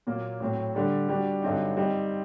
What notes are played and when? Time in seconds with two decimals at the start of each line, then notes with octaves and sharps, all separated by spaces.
0.07 A#2 F#3 A#3
0.40 A2 F#3 C4
0.75 D3 G3 D4
1.09 G3 D4 F#4
1.42 G2 D3 F#3 C4 D#4
1.77 G3 C4 D#4